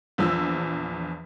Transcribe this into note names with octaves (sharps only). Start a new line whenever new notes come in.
A#1 E2 F3 E6